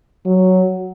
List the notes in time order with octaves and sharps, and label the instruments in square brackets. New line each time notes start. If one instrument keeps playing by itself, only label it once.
[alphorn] F#3